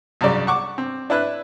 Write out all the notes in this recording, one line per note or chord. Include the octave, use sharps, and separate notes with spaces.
C2 F#2 C#3 D5
F#5 C#6 D6
C4
D4 E4 B4 F#6